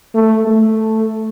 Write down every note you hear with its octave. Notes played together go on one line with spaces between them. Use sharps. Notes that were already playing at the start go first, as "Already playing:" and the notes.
A3
A3